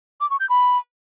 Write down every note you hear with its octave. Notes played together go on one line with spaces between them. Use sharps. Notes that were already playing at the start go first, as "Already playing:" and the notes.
D6
C#6
G6
B5